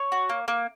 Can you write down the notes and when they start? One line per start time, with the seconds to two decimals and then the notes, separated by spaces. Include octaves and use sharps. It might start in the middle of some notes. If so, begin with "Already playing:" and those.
Already playing: C#5 C#6
0.12 F#4
0.29 A#3
0.48 A#3